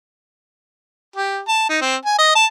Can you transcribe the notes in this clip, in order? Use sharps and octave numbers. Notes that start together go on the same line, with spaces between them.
G4
A5
D#4
C4
G#5
D#5
A5